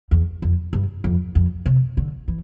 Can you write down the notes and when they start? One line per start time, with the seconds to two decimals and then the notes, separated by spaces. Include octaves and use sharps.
0.11 E2
0.42 F2
0.73 G2
1.04 F2
1.35 F2
1.66 C3
1.97 D3
2.28 E3